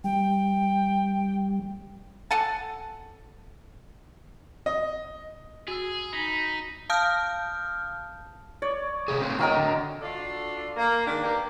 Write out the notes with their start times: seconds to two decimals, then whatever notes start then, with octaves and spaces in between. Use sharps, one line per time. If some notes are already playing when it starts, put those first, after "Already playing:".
0.04 G3 G5
2.31 A4 F#5 G#5 A5
4.66 D#5
5.68 F#4 G#4 E6
6.13 D#4 B5
6.90 F5 A5 D#6 F6 G6
8.62 C#5 D5
9.08 A2 C3 G#4
9.21 A3 B3 C4
9.39 A2 F#3 A#4 D#5 F5 G5
9.56 D3
10.02 D4 F4 F#4 A4 D5
10.76 A#3
11.06 D#3 G#3 A#3 D4
11.23 A#3 B3 G4 A#4